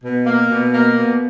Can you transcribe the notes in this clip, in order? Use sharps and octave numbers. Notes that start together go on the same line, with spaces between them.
B2
A#3
B2
A#3
B2